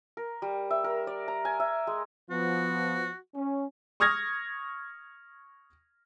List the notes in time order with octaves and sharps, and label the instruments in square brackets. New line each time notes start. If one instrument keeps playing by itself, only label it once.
[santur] A#4
G3
E5
A#4
D5
A#5
G#5
E5
G#3
[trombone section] F3 B3 [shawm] F#4
[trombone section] C#4
[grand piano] C#6 D#6 F6 G#6 A#6